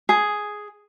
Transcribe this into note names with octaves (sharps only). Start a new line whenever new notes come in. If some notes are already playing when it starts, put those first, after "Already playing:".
G#4